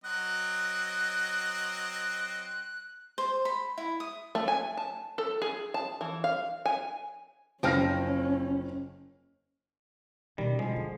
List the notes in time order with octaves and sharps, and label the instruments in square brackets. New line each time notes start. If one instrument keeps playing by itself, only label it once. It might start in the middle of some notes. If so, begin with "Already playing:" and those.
[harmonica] F#3 C4 D#5 [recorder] F#6
[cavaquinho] C5
B5
E4
D#6
[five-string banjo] A3
G#5
A5
A4
G#4
A5
E3
F5
G#5
[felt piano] F#1 F6 A#6 [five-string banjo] F3 C4 C5 [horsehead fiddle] C#4
[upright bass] B2 C#4 [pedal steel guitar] D#3 [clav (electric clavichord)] G3
[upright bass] B2 [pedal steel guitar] D3 F3 [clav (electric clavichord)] G#3
[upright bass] F#3